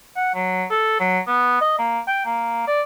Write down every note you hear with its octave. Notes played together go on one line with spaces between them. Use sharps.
F#5
F#3
A4
F#3
B3
D#5
A#3
G5
A#3
D5